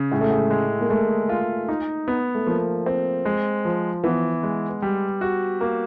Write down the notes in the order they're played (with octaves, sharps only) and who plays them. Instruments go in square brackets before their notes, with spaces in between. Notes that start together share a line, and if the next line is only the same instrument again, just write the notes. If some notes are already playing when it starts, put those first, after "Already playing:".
Already playing: [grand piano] C#3
[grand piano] A2 [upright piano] G#3
[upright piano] A3
G#3
[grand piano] G#3
[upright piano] A#3
[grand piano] G#3 [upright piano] A3
[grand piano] F4
D#4
B3
[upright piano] A3
[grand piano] F3 [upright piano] A#3
[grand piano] C4
G#3
F3
[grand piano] E3 [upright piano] B3
[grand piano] G#3
G3
F#4
A#3